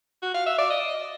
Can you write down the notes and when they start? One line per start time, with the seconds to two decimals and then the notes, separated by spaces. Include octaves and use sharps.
0.23 F#4
0.34 F5
0.46 E5
0.58 D5
0.70 D#5